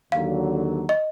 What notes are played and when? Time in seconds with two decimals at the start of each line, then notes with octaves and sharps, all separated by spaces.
0.12 D#2 D3 F#3 F5
0.89 D#5